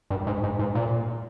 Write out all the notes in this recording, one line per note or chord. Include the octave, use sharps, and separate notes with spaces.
G2
G#2
G#2
G#2
A#2